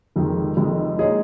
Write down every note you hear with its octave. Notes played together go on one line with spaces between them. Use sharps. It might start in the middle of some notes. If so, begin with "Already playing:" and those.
F1 F2 D#3 G#3
F1 F2 D#3 G#3
A#2 G#3 D#4 G#4 C#5